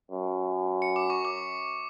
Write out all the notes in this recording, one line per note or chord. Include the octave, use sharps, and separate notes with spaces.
F#2
C#7
D6
C#6
D6